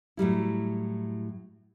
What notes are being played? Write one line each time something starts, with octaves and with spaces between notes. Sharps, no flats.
A2 F#3 G3 E4